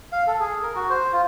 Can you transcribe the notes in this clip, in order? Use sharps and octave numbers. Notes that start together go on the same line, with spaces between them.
F5
A4
G#4
A#4
F#4
C5
F4